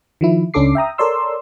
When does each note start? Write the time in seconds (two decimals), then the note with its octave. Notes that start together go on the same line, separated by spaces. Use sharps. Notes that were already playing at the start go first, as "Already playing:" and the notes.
0.21 D#3 F3 E4
0.54 C#2 C#4 D4 A4 D6 C7
0.75 E5 G5 A#5 D#6
0.98 A4 A#4 C#5 D5 C6 E6